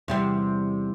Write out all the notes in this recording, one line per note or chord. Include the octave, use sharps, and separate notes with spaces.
E2 C3 G3